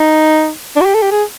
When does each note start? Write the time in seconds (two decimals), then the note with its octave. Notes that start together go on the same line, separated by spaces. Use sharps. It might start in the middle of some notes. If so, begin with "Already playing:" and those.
Already playing: D#4
0.77 D4
0.81 F#4
0.86 G4
0.95 A4
1.02 G4
1.11 G#4